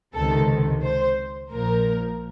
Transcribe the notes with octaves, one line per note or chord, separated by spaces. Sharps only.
C#2 C3 D#3 A4
C5
A#1 A#2 F3 A#4